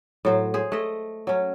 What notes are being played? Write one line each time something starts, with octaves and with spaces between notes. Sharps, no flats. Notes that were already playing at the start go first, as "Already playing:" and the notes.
A2 F#3 C5
G#4 C5
A3 D#5
F#3 C#4